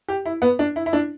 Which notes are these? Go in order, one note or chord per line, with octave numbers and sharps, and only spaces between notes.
G4
E4
B3
D4
E4
E4
D4